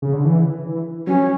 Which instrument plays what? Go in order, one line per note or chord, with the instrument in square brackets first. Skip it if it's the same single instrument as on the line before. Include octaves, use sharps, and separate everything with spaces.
[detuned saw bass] C#3
D3
E3
E3
[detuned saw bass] F#3 [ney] C#4